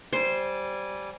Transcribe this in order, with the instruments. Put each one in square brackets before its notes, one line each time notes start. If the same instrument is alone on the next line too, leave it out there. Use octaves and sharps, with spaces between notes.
[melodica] G3 G#5 D6 [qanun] C5